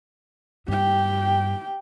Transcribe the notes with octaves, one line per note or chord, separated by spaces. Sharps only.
G2 G4 G5